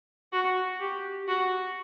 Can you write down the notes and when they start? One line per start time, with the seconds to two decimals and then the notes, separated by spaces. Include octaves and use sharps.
0.32 F#4
0.80 G4
1.28 F#4